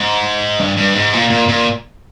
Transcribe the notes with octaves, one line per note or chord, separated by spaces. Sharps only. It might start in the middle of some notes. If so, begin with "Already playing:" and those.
Already playing: G#2
G2
G2
G#2
A#2
A#2
A#2